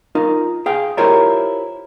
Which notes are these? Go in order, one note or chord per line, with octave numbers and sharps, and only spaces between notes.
D#4 F4 A#4
G#4 F5 G5
E4 F4 G4 A#4 C5 C#5